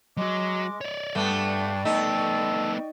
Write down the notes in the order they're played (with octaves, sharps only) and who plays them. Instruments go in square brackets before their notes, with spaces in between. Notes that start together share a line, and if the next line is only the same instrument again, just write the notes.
[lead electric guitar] F#3 F#4 [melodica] G#3 [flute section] D#5 D6
[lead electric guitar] C#5 D5
[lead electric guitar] G2 [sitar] A3 B3 [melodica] D4 [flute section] D5 G5 C#6
[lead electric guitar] A3 B3 [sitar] D#4 [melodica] A4